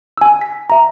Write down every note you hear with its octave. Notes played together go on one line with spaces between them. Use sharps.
G#5 E6
B6
E5 A#5